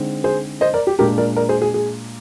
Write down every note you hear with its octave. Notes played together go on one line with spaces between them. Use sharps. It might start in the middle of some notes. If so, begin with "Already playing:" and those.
Already playing: D3 G#3 C4 D#4
G#4 C5
C5 D#5
A#4 D5
G4
A#2 G#3 D4 G4 A#4
A#4 D5
A#4 D5
G#4 C5
G#4
G#4